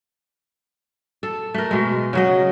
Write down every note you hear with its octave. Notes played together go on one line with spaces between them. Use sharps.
A4
A3 A#4
B2 G#3
C#3 F#3 D#5